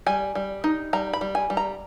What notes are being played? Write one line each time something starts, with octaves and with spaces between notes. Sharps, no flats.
G3 G#5
G3
D#4
G3 A#5
B5
G3
G#5
G3
A#5